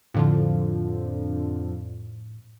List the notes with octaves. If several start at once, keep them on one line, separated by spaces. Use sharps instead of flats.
F2 A2 D3 F3